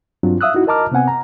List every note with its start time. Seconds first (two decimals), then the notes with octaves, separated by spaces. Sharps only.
0.23 G2 F#3 C4 D4 F4
0.41 E5 F5 D#6 E6 F#6
0.54 D#4 E4 F#4
0.67 A#4 D#5 A5 A#5 D6 F6
0.92 C3 B3 C4 F#5 G#5
1.08 A#5